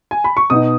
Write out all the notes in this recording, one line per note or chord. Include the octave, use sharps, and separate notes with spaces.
G#5
B5
C#6
B2 B3 D#4 D#6